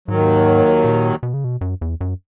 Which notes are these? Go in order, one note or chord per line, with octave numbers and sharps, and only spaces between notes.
D#2 G#2 D#3 F#3
A#2
B2
C#3
B2
F#2
E2
F#2